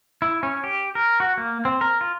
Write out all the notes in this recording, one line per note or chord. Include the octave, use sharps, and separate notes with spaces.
E4
C#4
G4
A#4
F#4
A#3
C4
A#4
F4